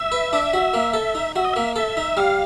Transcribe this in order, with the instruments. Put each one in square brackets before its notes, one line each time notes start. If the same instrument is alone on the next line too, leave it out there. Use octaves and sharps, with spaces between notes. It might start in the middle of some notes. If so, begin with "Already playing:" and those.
Already playing: [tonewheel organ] E5
[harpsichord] B4
D4
F#4
A#3
A4
D#4
[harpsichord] F#4 [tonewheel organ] E5
[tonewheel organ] D#5
[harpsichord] A#3 [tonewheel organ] E5
[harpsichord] A4 [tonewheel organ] E5
[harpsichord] D#4
[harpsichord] G3 [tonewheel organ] F5